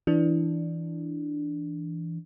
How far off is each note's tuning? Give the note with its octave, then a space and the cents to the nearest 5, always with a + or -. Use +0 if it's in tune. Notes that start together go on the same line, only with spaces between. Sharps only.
E3 +0 D4 +0